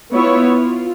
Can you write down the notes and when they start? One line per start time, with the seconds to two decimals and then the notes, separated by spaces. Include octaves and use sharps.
0.14 B3 E4 F4 C#5
0.46 F4